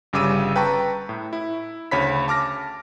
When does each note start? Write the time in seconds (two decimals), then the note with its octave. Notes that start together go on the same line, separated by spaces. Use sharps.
0.13 G1 C#3 G3 D6 E6 D#7
0.56 B4 G5 A5 A#5 C#6
1.09 A2
1.33 E4
1.91 D2 C#3 C#5 B5 B6
2.28 A5 D6 F6 A#6